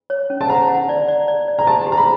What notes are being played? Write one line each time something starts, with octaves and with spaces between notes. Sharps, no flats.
C#5
C#4
A5
F#5 A#5
F#5
D5
D5
D5
D5
A#5
G4 A5
G4
A#5
B5